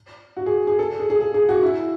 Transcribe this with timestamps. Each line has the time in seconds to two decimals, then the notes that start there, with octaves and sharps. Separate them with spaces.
0.37 F#4
0.46 G#4
0.67 G#4
0.79 A4
1.00 G#4
1.10 G#4
1.21 G#4
1.34 G#4
1.49 F#4
1.62 E4